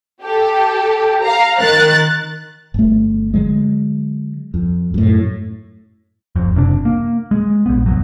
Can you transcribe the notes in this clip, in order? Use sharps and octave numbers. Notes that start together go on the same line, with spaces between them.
G4 A4
F5 A#5
D#3 A#4 F#6 A6
G1 A3
D3 F#3 G#3
F2
F#2 A2
F#1 F2
F#1 C3 C#4 D4
A#3
G#3
A#1 B3
F1 D#2 F#3